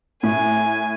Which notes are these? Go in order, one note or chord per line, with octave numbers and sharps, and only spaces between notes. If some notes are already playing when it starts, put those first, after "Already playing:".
A2 G#5